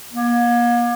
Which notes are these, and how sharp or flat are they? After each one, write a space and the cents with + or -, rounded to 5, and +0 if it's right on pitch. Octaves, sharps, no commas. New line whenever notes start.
A#3 +40